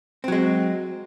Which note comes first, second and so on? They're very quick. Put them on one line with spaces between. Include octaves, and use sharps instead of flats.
C4 F#3 G#3